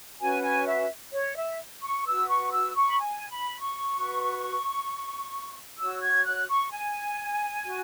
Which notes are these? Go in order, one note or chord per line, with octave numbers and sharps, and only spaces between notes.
C#4 F#4 B4 G#5
G#5
E5
C#5
E5
C#6
F#4 B4 E6
C#6
E6
C#6
B5
G#5
B5
C#6
F#4 B4
F#4 C#5 E6
G#6
F#6
C#6
G#5
F#4